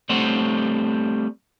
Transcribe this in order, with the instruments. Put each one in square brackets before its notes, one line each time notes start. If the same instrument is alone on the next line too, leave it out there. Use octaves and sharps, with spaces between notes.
[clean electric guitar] G3 A3 C4 C5 C#5 F#5